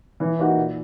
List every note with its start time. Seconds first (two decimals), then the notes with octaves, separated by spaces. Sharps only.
0.20 E3
0.38 A#3 D#4 F#4
0.56 A#2